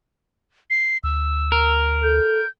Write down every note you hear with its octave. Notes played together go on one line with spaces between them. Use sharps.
C7
D2 E6
A#4
A4 G6